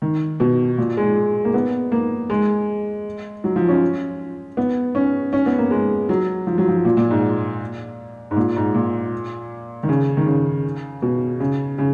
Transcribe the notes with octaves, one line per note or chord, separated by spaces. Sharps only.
D#3
B2
A#2
G#3
A#3
B3
A#3
G#3
F#3
F3
C#4
B3
C#4
C#4
B3
A#3
G#3
F#3
F3
F#3
F3
A#2
A#2
G#2
G#2
A#2
G#2
A#2
D#3
C#3
D#3
C#3
B2
C#3
C#3